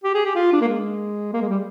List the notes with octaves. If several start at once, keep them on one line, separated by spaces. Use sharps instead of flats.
G4
G#4
G4
F4
D4
A#3
G#3
A#3
G#3
G3